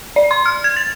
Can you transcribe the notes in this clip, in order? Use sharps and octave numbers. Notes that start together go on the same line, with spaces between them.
D5
C6
F6
G#6
A6